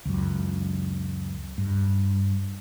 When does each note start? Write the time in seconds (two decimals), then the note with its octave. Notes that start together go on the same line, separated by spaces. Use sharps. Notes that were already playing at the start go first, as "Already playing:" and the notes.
0.05 C#2 F#2
1.58 G2